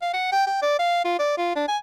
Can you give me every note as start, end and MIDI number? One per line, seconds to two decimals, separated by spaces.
0.02 0.09 77
0.13 0.32 78
0.32 0.43 79
0.47 0.59 79
0.62 0.78 74
0.79 1.02 77
1.05 1.18 65
1.19 1.36 74
1.38 1.55 65
1.56 1.64 62
1.68 1.77 80